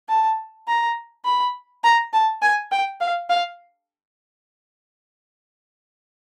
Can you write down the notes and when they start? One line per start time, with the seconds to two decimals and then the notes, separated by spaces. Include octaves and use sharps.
0.09 A5
0.68 A#5
1.25 B5
1.84 A#5
2.13 A5
2.42 G#5
2.72 G5
3.00 F5
3.30 F5